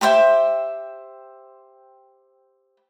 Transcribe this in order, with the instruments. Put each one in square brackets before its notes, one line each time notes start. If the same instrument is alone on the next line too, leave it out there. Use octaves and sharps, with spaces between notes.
[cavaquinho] G4 C5 E5 G5